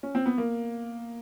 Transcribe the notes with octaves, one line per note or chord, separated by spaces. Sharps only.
C#4
C4
B3
A#3